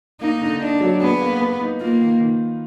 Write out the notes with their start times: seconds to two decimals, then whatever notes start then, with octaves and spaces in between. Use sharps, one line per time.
0.21 A#3 D#4
0.41 D3
0.61 D4 D#4
0.81 F#3
1.01 B3 G#4
1.20 A#3
1.41 B4
1.61 D#4
1.81 A#3 F4
2.01 D#3
2.20 D#3